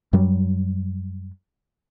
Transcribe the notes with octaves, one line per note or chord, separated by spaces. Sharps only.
F#2 F#3 G3